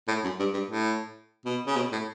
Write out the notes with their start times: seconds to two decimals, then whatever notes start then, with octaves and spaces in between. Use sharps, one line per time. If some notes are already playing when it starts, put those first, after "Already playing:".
0.08 A2
0.24 F#2
0.39 G2
0.54 G2
0.70 A2
1.45 B2
1.67 C#3
1.76 B2
1.92 A2